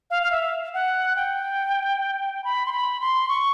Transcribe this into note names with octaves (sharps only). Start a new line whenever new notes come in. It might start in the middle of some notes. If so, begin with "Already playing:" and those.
F5
F5
E5
F#5
G5
B5
C6
B5
C6
C#6